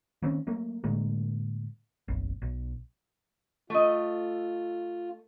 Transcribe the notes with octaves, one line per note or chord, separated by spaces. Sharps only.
D#3 A#3 C4 C#4
F#3 A3 A#3
A2 D3 G#3 A#3
F#1 B1
B1
A3 F4 D#5